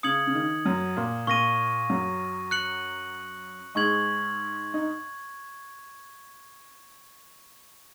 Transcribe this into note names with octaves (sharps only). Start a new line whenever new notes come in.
C#3 D#6 G#6 C#7 F#7
C#3
D#3
F#2 F#3
A#2 A#3
A#2 A#3 C#6 A#6 D#7
F#2 F#3
F#6 C#7 F#7
G#2 G#3 C#6 G#6 F#7
D#4